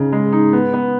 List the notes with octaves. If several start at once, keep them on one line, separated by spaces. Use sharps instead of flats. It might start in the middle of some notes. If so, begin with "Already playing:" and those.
Already playing: C#3 D#4
G#3
D#4
B3
B3